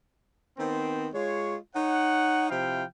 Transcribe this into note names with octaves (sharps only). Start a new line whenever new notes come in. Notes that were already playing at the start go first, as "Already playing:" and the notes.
D#3 B3 C4
G#3 F4 C#5
D#4 C#5 F#5
C3 F3 E4 F5 G5